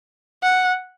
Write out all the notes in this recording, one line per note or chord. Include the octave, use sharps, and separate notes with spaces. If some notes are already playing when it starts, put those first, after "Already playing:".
F#5